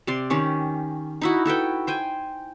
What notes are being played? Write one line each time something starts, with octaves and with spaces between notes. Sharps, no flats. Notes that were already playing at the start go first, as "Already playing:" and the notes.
C3 D5 C6
D#3 C#4 G4
D#4 E4 F#4
F#4 A4 B4 G5
C5 G5 G#5